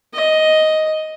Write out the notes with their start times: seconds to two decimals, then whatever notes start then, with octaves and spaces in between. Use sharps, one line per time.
0.14 D#5